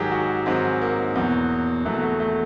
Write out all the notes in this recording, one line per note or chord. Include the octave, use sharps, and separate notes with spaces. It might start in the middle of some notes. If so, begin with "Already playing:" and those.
Already playing: G#2 D#3 F#3 G4 G#4
F#4
G#2 D#3 F#3 C4
A#3
E2 B2 F#3
E2 B2 F#3 A3
A3
A3